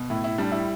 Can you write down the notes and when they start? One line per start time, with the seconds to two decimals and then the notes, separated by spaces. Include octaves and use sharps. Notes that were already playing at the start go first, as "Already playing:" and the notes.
Already playing: B2
0.10 A2 E4
0.24 E4
0.38 G3 D4
0.52 E4